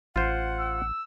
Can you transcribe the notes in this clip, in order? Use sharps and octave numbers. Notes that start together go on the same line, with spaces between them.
A1 F4 C5 F#5
E6